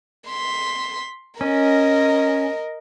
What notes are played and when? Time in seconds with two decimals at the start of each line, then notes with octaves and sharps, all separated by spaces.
0.28 C6 B6
1.41 C#4 A#4 D#5